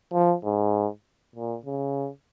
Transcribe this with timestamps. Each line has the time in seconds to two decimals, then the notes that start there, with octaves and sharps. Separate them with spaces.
0.13 F3
0.44 G#2
1.35 A#2
1.65 C#3